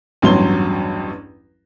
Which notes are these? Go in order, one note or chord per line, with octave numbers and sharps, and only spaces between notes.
A1 E2 G2 F#3 C6 G7